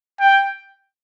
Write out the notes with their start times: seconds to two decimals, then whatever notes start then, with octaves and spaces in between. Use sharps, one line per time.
0.20 G5